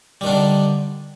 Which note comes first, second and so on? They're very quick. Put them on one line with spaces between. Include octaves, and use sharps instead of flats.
G3 D#3 D4 D3